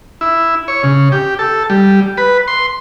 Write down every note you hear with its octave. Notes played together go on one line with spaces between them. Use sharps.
E4
C#5
C#3
G4
A4
G3
B4
C6